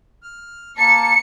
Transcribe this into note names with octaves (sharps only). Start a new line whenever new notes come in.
F6
A#3 A5 C#7